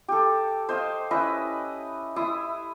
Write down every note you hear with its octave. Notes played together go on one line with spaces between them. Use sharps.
G4 A4
C5 D#5 F5
C#4 E4 B4 D#5
E4 C6 D#6